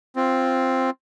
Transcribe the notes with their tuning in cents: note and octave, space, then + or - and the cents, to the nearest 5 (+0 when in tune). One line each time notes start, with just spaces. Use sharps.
C4 +5 F4 +0